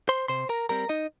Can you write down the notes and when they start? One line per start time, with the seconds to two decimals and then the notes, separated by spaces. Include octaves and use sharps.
0.09 C5 C6
0.28 C3 C5 C6
0.49 A#4 A#5
0.69 G3 C4 A#4 A#5
0.89 D#4 D#5